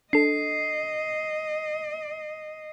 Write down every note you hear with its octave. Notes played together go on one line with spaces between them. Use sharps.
D4 A4 D#5 C7